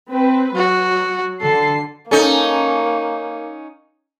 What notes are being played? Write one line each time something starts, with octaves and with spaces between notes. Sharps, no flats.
C4 B4
F#3 F#4
D3 A4 C7
A#3 C#4 D#4 A4